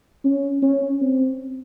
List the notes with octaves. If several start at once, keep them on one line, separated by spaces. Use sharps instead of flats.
C#4
C#4
C4